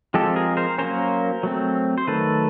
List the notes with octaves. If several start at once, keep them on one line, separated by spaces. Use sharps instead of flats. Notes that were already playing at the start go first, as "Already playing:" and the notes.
F3 G#3 C4 G4 A4
G#4 A#4
A#4 C5
F#3 A#3 C#4 A#4 C5
F#3 A3 C4
C5
D#3 F#3 A3 A4 B4